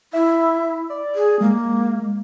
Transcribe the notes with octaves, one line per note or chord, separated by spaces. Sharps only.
E4 E5
D5
G#4
G#3 A#3